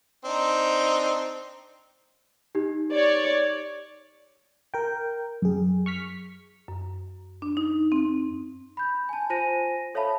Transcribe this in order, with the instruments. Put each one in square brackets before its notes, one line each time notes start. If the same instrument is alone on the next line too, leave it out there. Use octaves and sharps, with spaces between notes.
[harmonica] C4 D4 D#4
[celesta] D#4 G4
[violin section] C#5 D5
[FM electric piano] A#4 G5
F#2 G#4
C#6 F6 B6
[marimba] F#2
D4
D#4
C4
[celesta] B5 G6
G#5 A5
F4 C5 G#5 A#6 D#7
A4 C#5 E5 F5 A5 B5